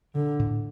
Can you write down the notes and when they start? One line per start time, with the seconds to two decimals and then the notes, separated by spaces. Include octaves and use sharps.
0.15 D3 D4
0.39 A2